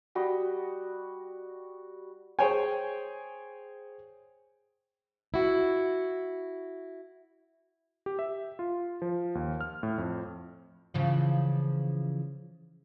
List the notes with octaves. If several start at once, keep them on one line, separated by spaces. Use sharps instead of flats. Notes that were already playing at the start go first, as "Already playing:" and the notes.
G3 F#4 D#5
G#4 C5 C#5 G5 G#5
E4 F#4
G4
E5
F4
F3
D#2
F6
A2
F2
C#3 E3 F3